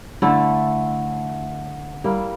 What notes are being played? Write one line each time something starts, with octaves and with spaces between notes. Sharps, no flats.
D3 A3 E4 A4
G3 A#3 E4